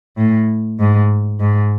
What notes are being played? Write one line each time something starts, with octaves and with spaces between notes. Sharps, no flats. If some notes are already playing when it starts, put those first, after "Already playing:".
A2
G#2
G#2